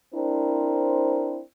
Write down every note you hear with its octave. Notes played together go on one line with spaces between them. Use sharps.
C4 D4 E4 A#4 C5